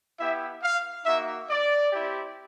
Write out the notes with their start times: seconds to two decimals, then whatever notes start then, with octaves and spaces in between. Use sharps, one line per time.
0.19 B3 E4 G4 E5
0.63 F5
1.06 A#3 D#4 F#4 E5
1.50 D5
1.93 C4 E4 G4